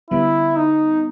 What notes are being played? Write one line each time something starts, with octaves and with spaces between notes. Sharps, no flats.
D3 G3 B3 E4
D#4